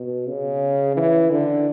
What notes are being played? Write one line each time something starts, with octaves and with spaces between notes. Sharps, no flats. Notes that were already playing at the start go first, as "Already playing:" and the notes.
Already playing: B2
C#3
E3
D3